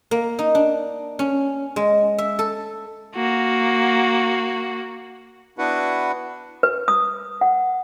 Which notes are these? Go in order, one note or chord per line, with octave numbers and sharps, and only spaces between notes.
A#3
D#4
D4
C#4
G#3
E5
A4
A#3 F#4
B3 D4 E4 F#4 B4 F#5
B4
D#6
F#5